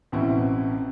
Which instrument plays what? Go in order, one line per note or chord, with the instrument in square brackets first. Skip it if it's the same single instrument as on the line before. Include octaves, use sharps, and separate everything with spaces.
[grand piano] A1 B2 C4 E4